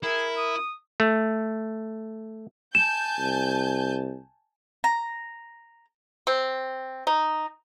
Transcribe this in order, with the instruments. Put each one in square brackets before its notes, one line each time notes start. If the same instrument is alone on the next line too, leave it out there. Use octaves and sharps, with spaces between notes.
[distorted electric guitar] E4 [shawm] G#4 [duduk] A#4
[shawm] D#6
[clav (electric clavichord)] A3
[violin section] G#5 A5 G6 [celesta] E7
[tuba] C2
[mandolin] A#5
[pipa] C4
D#4